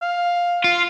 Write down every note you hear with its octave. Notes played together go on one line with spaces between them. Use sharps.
F5
F4